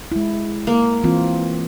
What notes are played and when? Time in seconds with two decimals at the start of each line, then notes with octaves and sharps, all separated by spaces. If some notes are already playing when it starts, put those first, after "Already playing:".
0.12 G#3 E4
0.67 A#3
1.04 E3 C4 F4